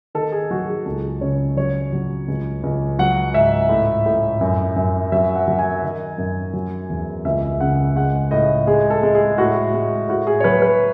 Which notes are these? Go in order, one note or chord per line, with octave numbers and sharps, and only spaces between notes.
D#3 A4
G#4
F#3 F#4
G#4
C#2 A4
C#3 C#5
F#3 C#5
F#3
C#2
C#2
F#3 F#5
G#2 E5
A2
A2
F#2
F#2
F#3 E5
F#5
F#3
G#5
D#3
F#2
F#3
E2
C#2 E5
C#3 F#5
G#3 F#5
A2 D#5
G#3 G#4
A4
G#3
G#4
A2 F#4
G#3
A2 F#4
G#4
C#5
F#3 B4
B4